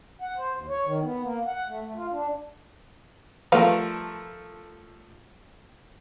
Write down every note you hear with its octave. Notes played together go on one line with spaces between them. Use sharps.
F#5
C5
D#2
C#5
D#3
B3
A#3
F#5
A3
A3
F4
D4
F3 G3 A3 A#4 B4 F5